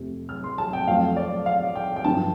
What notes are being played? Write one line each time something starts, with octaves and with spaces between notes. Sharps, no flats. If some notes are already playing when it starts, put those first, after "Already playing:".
Already playing: F2 C3 A3
F6
C6
A5
G5
F2 F3 A3 F5
D5
F5
G5
G5
G2 D3 F3 A5